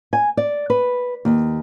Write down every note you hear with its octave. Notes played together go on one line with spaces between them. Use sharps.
G#5
D5
B4
D#2